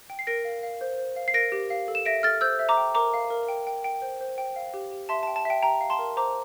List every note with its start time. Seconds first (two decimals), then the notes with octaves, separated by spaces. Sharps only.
0.10 G5
0.19 C7
0.27 A#4 A#6 D7
0.45 F5
0.63 F5
0.81 C5
0.98 C5
1.16 F5
1.28 C7
1.34 A#4 A#6 D7
1.52 G4
1.70 F5
1.88 A4
1.95 E7
2.06 E5 A#6 D7
2.23 A4 F6 A6
2.41 C5 E6 G6
2.59 E5
2.69 A#5 D6
2.77 G5
2.95 A#4 A#5 D6
3.14 F5
3.30 A#4
3.48 G5
3.67 G5
3.84 G5
4.02 C5
4.21 C5
4.38 G5
4.56 F5
4.74 G4
4.91 G4
5.09 E5 A5 C6
5.23 A5
5.27 G5
5.36 A5
5.45 E5 G5
5.63 G4 G5 A#5
5.81 F5
5.90 A5 C6
5.99 A#4
6.17 C5 A#5 D6